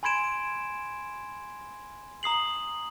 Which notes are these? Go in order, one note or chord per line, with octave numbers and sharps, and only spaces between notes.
G#5 B5 C6 G#6 D7 E7
A#5 D#6 C7 F#7